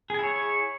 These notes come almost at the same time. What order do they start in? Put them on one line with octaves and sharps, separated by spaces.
G#4 G#5 E4 C#5